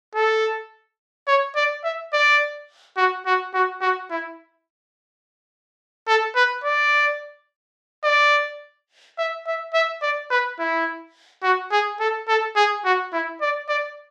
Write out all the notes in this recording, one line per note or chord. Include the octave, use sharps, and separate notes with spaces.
A4
C#5
D5
E5
D5
F#4
F#4
F#4
F#4
E4
A4
B4
D5
D5
E5
E5
E5
D5
B4
E4
F#4
G#4
A4
A4
G#4
F#4
E4
D5
D5